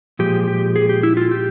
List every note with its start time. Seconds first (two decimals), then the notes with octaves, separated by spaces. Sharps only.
0.19 A#2 F3 G#3 G4
0.48 G4
0.76 G#4
0.89 G4
1.03 E4
1.17 F4
1.31 G4